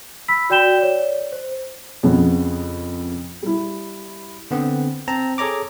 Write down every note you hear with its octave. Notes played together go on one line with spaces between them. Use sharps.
B5 E6 B6
F#4 D5 G5 G6 E7 G7
C#5 D5
C5
F2 C#3 B3 C#4
G3 E4
D3 B3 C4
C4 A5 A#5
G#4 A4 C#5 A#5 D6